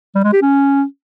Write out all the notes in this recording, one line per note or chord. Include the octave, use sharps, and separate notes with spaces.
G3
G#3
G4
C#4